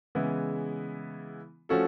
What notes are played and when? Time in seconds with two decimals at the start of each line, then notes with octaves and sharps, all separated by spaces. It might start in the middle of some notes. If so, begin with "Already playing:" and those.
0.15 C#3 E3 G#3 B3 E4
1.69 F3 A3 C#4 F#4 A4